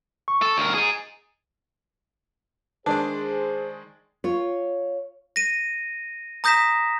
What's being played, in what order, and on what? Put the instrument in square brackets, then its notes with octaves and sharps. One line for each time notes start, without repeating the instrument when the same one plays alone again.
[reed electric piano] C#6
[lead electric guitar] A4
D2 A#4
D#4 G#4
[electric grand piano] D#3 G#3 D5 [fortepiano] D4 [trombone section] G#4 C5
[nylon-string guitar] F4 C#5
[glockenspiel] A#6 D#7
A#5 D#6 G6 A#6 B6 E7